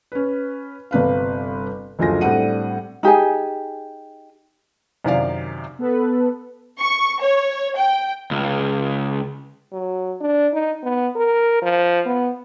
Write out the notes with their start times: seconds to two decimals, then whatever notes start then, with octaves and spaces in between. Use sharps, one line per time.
0.12 C#4 B4
0.91 G1 C3 B4 F5
1.99 F#1 D2 F3 F4 G#5 A#6
2.21 A2 G3 C4 D4 F#5 D#7
3.03 D#4 G4 G#4 G#5
5.05 F#2 C3 D#3 D5 F5
5.79 B3 A4 B4
6.80 C#6
7.22 C#5
7.77 G5
8.31 C#2
9.73 F#3
10.21 D4
10.53 D#4
10.83 B3
11.16 A#4
11.62 F3
12.06 B3